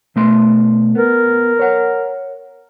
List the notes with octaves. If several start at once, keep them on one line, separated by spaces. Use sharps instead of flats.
B2 A3 C6
B3 A#4
C#5 F#5